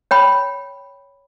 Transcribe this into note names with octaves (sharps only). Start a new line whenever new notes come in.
C#5 G5 B5